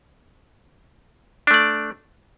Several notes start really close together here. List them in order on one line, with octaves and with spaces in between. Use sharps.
D4 A3 D5